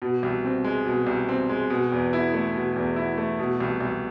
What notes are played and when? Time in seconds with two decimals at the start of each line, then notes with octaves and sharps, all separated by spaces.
0.02 B2
0.23 C2
0.45 C4
0.64 G#3
0.86 B2
1.07 C2
1.29 C4
1.49 G#3
1.70 B2
1.92 E2
2.13 E4
2.34 A3
2.55 B2
2.76 E2
2.96 E4
3.18 A3
3.39 B2
3.60 C2
3.80 C2